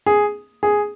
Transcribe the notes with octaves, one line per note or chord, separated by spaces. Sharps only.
G#4
G#4